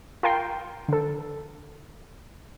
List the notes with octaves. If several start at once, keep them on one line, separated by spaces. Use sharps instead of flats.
F4 A#4 G5 C6
D3 A4